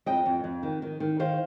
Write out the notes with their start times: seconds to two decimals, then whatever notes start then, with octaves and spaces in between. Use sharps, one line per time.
0.06 F2 D#5 G5
0.26 F2
0.44 F2
0.63 D#3
0.82 D#3
1.00 D#3
1.19 D#3 C5 F5